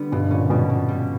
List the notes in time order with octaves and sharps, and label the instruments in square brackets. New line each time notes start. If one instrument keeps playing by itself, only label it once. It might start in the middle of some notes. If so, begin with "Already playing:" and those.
Already playing: [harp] D3 G3 B3
[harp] G2 [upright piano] B2
[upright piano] A#2 [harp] C#4
[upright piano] B2 [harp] G3
[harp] G3
G3